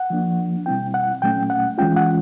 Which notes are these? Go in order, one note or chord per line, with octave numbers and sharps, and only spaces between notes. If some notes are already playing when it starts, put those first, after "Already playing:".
Already playing: F#5
F3 A#3 D4
B2 G3 C4 E4 G5
F#5
A#2 F#3 A3 C#4 G5
F#5
E3 G#3 C#4 F4 G5
F#5